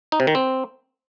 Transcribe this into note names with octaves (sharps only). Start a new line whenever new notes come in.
D#4
C3
D#3
C4